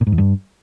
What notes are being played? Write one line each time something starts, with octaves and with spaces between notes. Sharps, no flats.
A#2
G#2
E2
G2